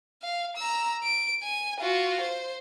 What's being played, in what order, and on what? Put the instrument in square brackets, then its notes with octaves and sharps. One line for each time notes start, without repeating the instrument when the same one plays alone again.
[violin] F5
A#5 E6
D7
G#5
F4 F#4
C5